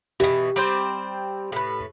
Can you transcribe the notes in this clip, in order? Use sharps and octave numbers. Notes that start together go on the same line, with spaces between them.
B2 E3 G4
G3 C4 C5
A2 B4